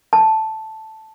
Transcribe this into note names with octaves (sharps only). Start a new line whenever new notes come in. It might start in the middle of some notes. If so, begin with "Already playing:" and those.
A5